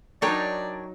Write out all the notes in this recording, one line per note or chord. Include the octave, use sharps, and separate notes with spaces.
F#3 D4 D#4 A#4 C#5 D5 G5